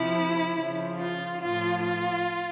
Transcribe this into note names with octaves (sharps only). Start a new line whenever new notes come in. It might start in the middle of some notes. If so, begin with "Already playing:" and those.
Already playing: C3 F3 E4
C#3 F3
F4
A2 F3 F4
F4